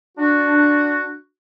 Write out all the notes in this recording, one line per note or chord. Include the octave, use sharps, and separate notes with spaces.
D4 F#4